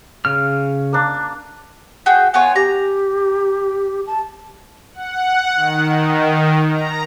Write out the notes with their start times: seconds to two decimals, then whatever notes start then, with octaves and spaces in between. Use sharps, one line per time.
0.25 C#3 F6
0.93 A#3 D4
2.06 F#4 G#4 G5
2.34 B3 F4 C#5 G#5
2.56 G4 A#5
4.07 A5
4.94 F#5
5.56 D#3
6.71 A#5